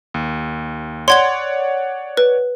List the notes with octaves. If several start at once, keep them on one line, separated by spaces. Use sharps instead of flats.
D#2
C#5 D5 F#5 C6 G#6 G7
B4